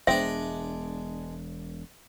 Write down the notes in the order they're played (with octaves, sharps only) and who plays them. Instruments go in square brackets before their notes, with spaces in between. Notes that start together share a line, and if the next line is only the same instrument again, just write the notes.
[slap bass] E1 B3 [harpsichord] G#3 D4 [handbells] C5 G5 [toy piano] E5